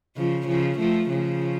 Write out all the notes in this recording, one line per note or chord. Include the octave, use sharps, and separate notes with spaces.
C#3 F3
C#3 F3
F3 A3
C#3 F3